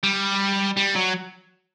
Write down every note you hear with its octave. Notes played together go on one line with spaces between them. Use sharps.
G3
G3
F#3